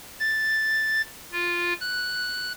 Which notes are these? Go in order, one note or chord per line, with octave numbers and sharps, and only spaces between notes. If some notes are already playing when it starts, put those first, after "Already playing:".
A6
F4
F#6